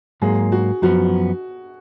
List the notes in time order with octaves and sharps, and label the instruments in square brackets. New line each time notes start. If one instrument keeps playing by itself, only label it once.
[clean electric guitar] G#2 F#3 A#3 [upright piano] G#4
[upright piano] F#4
[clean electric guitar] F#2 F3 B3 [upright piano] F#4